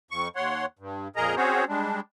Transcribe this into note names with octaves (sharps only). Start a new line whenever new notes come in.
F2 C#6
D#2 C#5 F#5 C6
G2
F2 A#2 G#4 A#4 D#5 A#5
C4 C#4 F#4 G#4 C5 C#5
G3 G#3 D4